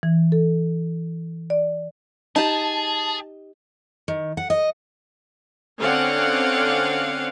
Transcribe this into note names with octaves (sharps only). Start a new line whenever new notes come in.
E3
A4
D5
D#4 G4 G#4 A5
D#3
F#5
D#5
D3 C4 C#4 D5 F5 F#5